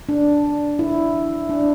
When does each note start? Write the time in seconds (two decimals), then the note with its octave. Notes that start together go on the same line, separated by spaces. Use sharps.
0.09 D4
0.79 E4
1.49 D4